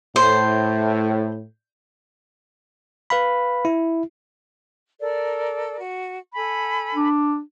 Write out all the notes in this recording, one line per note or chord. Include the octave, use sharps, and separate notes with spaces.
A2 C5
B4 F5 B5
E4
A4 A#4 D5
F#4
A4 G#5 B5
D4